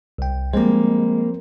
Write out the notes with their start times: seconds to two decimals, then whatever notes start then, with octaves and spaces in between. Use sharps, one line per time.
0.18 C2 G5
0.53 F3 G3 G#3 A#3 C4 C5